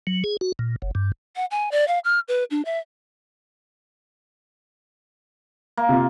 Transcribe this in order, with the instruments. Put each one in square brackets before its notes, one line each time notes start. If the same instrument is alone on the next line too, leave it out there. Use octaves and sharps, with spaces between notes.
[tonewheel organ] F#3
G#4
F#4
A#2
F#1
G2
[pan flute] F#5
G#5
D5
F5
F6
B4
D4
E5
[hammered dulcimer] A#3
[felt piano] C3 F4